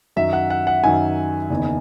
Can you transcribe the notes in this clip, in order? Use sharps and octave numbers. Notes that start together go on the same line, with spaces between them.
F#2 D#3 F#3 E5
F#5
F#5
F#5
F#2 D#3 F#3 G#5
F#1 E2 D#3